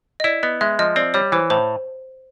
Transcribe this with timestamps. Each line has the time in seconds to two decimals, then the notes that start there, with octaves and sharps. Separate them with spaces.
0.20 D#5
0.24 E4 D5
0.43 B3 D#5
0.61 G#3 E5
0.79 F3 D#5
0.96 C4 D5
1.14 G3 C#5
1.32 E3 C5
1.50 A2 C5